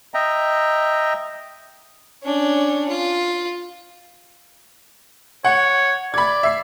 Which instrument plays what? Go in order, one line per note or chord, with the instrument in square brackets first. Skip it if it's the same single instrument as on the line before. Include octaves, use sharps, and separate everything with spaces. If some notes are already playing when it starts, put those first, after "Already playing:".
[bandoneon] D#5 E5 G5 A#5
[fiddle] C#4 D4
F4
[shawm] C#5 [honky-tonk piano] F#5
[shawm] D5 [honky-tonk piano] B5 G#6
[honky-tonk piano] E5 C7